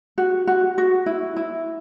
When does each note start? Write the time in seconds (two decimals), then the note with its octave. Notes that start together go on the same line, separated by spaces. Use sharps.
0.18 F#4
0.47 F#4
0.78 F#4
1.06 E4
1.36 E4